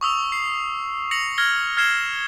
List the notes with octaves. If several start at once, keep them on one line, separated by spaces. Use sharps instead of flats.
C#6 D#6 E6 F7
C7
A#6 C#7 F7 F#7
F6 G#6 A#6 G7
F6 G#6 C7 E7 G7